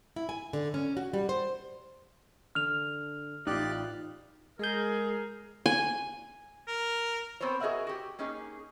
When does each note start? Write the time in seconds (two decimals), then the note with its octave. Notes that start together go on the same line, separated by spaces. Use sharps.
0.16 E4
0.29 G#5
0.53 D3
0.74 C#4
0.97 F#4
1.13 G3
1.29 C5
2.55 D3 F6 F7
3.47 A1 D#4 F4 G4 D5 F#6
4.59 G#3 G#4 A#4 G6
5.66 G#5
6.67 A#4
7.40 B3 C4 A#4 C5 C#5
7.60 F#4 G#4 A#4 D#5 E5 F#5
7.87 F#4 G4
8.19 A#3 C#4 D#4 G#4